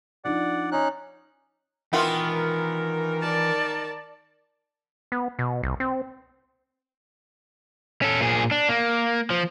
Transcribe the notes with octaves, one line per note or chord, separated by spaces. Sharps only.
F3 D4 D#4 D5 F#5
C#4 D#4 F#6
D#3 E3 B3 E4 F4 A#4 G5
D5 A5
B3
B2
C2
C4
C#4 A4
A#2 G#4
D4
A#3
F3